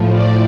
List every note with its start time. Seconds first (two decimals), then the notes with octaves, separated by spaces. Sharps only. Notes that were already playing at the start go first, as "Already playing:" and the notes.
Already playing: A2 F3
0.12 D5